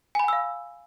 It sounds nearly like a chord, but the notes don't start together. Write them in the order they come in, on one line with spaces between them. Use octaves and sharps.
G#5 B5 F#5 E6 F5